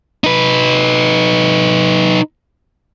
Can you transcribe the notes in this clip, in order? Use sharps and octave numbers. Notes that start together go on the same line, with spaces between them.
D#4 B4